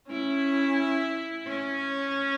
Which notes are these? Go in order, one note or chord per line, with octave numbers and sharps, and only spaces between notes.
C#4 E4
C#4